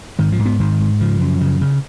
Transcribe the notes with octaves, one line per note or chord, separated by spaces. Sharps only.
G#2 D#3
F3
G#2
B3
G#2 D#3
G#2
C#3 F3
F#2
C#3
C#3